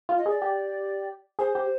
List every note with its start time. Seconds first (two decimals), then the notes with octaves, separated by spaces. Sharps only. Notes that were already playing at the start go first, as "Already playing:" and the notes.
0.09 F4
0.18 D#5
0.26 G#4 D5
0.42 G4
1.39 G#4 C5
1.55 G4